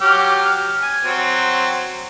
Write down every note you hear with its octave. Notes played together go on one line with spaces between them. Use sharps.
F#3 G4 F6
G#5
F#3 C4